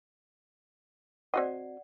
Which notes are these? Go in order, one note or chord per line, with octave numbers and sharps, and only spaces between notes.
C4 F#4 D5 D#5 F#5